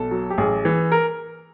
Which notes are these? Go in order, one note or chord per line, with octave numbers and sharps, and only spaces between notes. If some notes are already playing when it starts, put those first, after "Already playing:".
Already playing: B1 A4
F#3
G4
A1 G#4
E3
A#4